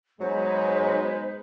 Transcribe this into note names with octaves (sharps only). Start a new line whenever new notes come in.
F#3 G#3 B3 D#4 B4 C5